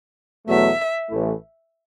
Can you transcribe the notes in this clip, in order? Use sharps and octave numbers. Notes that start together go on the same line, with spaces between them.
E2 B2 F#3 A3 E5
A1 A2 E3 A3 E4